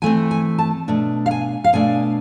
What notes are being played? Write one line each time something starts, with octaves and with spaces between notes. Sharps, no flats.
E3 A3 C4 G#5
G#5
A5
B2 A3 D4
F5
G#5
F5
B2 A3 D4 G#5